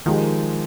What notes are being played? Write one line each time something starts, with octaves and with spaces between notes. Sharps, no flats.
D#3 F3 G#3 D#4 G4